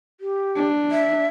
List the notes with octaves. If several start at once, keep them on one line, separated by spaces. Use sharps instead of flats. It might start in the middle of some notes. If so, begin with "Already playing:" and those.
G4
D4
E5